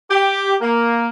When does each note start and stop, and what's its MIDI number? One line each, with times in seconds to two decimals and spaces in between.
0.10 0.55 67
0.62 1.08 58